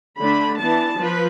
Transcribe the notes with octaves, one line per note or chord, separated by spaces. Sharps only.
D3 A3 D4 B5
E3 B3 D4 A5
F3 B4